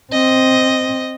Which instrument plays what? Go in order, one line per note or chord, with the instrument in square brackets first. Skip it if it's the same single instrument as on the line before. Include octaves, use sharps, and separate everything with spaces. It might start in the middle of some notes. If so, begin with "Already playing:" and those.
[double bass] C4 [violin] D#5